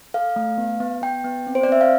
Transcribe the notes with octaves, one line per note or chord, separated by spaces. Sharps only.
A4 F5
A3
B3
B3
B3 G5
B3
C4
C5
D5
C4 E5
F5